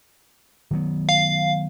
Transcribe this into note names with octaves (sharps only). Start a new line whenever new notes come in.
D#3 F#3 B3
F5